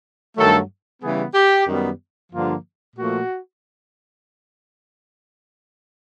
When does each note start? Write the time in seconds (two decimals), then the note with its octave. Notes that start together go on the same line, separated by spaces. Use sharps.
0.36 G2 D#3 F#3 A3 A4
1.01 C#3 E3 G3 B3 G#4
1.34 G4
1.67 F#2 D#3 G3 B3
2.32 G2 D3 F3 A#3 F4
2.96 A#2 F3 A3 F#4